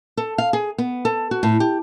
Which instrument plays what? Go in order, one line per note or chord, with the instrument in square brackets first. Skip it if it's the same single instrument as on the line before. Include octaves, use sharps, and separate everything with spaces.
[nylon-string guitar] A4
F5
G#4
B3
A4
F#4
A2
G4